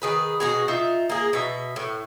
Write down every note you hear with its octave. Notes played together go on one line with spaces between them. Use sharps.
D#3 G#4 B4
B2 F#4 G#4
D#4 F4 E5
A#3 G#4
B2 E5
A2